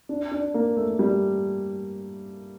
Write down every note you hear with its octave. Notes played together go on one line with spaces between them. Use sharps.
D4
D4
A#3
A3
G3